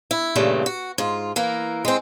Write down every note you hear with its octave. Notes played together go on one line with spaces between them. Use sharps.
E4
G2 A#2 C#3 E3 G3 A3
F#4
G#2 F4
E3 A#3 A#4
G#3 C4